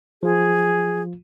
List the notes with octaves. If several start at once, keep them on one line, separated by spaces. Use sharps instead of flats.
F3 F4 G#4